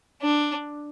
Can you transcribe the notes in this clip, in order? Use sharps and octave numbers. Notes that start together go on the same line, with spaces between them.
D4